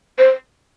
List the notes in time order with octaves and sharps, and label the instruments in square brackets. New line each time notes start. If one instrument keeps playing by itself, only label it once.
[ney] C5